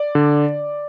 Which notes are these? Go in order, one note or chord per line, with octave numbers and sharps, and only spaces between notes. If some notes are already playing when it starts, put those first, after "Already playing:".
Already playing: D5
D3